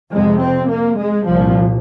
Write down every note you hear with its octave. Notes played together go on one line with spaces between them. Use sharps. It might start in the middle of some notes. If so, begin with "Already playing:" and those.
F2 C3 G#3
C4
A#3
G#3
C2 A#2 F3